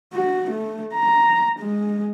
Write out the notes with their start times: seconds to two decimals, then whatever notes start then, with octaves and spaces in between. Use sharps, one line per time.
0.13 F#4
0.51 A3
0.94 A#5
1.60 G#3